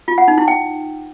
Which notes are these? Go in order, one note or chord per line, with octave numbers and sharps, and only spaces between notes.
F4
F#5
D#4
E4
G5